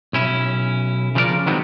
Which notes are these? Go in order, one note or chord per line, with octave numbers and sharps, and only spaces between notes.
B1 C#4 E4
C#3 F3 C#4 D4 A#4 D5
D#3 F#3 G#3 B3 C4